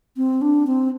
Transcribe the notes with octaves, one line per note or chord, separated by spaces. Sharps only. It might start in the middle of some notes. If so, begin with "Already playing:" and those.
C4
D4
C4